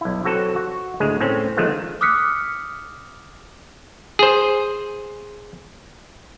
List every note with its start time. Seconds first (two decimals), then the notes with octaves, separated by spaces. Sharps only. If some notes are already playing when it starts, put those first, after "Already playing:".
0.01 B1 E4
0.24 F#3 C4 F#4 A4 B4
0.56 F#4
1.00 D2 A2 G#3 G#4
1.20 A2 C4 C#4
1.57 D#3 F3 G#3 A3 B3
2.01 D6 D#6 F6 F#6 B6 C#7
4.19 G#4 C5